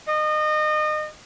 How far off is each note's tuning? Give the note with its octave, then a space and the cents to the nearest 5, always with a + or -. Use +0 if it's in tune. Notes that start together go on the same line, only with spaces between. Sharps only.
D#5 -30